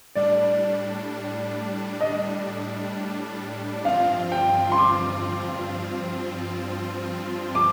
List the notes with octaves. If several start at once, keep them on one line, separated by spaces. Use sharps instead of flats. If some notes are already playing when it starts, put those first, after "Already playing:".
A2 G3 D4 D5
D#5
G2 F3 C4 F4 F5
G5
C6
D6
D6